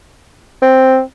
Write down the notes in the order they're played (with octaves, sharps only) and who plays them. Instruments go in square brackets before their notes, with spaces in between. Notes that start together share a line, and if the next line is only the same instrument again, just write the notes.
[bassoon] C4